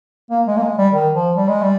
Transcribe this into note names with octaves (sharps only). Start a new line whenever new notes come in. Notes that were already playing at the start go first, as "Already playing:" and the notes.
A#3
G#3
A#3
G#3
G3
D#3
F3
G3
G#3
G3